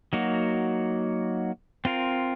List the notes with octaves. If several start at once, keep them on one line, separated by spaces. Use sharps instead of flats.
F#3 A#3 D#4 F#4
C4 F4 A#4